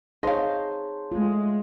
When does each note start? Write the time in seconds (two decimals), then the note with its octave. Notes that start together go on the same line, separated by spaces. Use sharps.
0.23 D#4 G#4 C5 C#5 D#5 F5 A5 C6
1.12 G#3 A3 F4